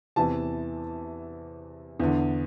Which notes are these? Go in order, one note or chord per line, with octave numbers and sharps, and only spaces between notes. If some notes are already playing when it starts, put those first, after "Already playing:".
E2 C3 E3 A5
E2 D3